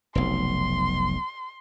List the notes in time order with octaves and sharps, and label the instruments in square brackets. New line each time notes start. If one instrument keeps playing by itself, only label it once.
[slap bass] F1 B1 [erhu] C6